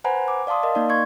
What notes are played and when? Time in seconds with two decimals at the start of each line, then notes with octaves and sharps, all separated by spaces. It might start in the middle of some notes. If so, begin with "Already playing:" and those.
0.04 B4 C5 F#5 G#5 A#5 B5
0.28 D6
0.47 D5 F5 A5 C6 D#6
0.63 A#4 D#5 F5
0.75 A#3 D#4 D5
0.89 C6 C#6 G#6